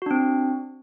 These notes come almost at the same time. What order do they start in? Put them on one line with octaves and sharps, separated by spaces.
F#4 D4 C4